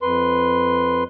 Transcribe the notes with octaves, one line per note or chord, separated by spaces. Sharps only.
F2 B4 C6